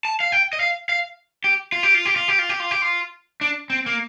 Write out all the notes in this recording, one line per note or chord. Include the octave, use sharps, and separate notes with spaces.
A5
F5
G5
D#5
F5
F5
G4
F4
G4
F4
G4
F4
G4
F4
G4
F4
G4
F4
D4
C4
A#3